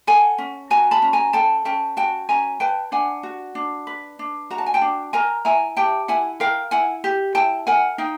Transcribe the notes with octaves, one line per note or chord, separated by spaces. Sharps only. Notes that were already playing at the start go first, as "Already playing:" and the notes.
A4 F#5 G#5
C#4
F#4 G#5 A#5
A5 B5
C#4
G#5 A#5
A4 G5 A5
C#4 G5 A5
F#4 G5 A5
C#4 G#5 A#5
B4 G5 A5
D4 F#5 G#5
F#4
D4
B4
D4
F#4 A#5
A5
G#5
G5 A5
D4
A#4 G#5 A#5
E4 G#5 A#5
G4 G5 A5
E4 F#5 G#5
A#4 F5 G5
E4 F#5 G#5
G4
E4 G5 A5
A#4 F#5 G#5
D#4 F5 G5